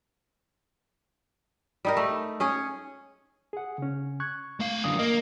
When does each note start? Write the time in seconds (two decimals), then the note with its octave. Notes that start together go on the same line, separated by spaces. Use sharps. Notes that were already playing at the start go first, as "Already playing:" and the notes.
1.85 G3 D#4 A#4
1.97 A3
2.40 C#4 G#4 C#5
3.53 G#4 F#5
3.78 C#3 C#4
4.20 C#6 F#6 G#6
4.60 A3 F5
4.84 F#2 D3 D#6
4.99 A#3 D#5